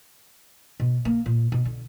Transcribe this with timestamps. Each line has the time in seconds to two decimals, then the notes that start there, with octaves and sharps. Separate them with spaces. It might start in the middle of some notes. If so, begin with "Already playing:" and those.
0.80 B2
1.05 A#3
1.26 A#2
1.52 B2
1.65 D3